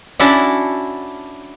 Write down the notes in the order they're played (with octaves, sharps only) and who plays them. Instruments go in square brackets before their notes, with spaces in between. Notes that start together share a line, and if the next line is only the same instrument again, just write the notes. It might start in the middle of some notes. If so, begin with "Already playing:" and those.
[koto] C#4 D4 E4 F#4 F#5 A5